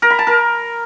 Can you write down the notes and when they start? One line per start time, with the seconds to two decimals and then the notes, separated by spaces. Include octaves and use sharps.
0.02 A#4
0.10 B5
0.19 A5
0.27 A#4